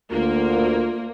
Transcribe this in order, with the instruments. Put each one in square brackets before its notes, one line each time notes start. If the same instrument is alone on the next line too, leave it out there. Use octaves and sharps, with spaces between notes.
[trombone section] D2 [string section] A#3 [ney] F4